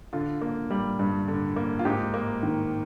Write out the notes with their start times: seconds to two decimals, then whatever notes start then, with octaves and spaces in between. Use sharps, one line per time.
0.13 D3 F4
0.42 A#3
0.70 G3
0.99 G2
1.28 D3
1.56 A#3
1.79 F4
1.85 G#2 G4
2.14 A#3
2.43 D#3